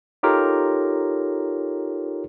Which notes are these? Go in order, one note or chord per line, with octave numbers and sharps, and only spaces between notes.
D#4 F4 G4 A4 A#4 C#5